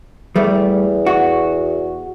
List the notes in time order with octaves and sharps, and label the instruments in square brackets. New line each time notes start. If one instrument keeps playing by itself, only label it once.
[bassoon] E2 [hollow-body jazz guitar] G3 A3
[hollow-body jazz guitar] F#4